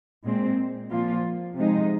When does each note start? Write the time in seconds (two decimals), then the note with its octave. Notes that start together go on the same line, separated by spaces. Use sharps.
0.25 A#2 G#3 C4
0.91 A#2 F3 A#3 F4
1.56 C3 F3 G#3 D#4